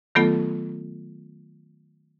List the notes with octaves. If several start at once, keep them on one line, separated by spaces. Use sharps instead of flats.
D#3 F#3 A3 B3 F4 A4